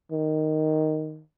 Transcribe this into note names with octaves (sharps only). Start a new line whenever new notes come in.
D#3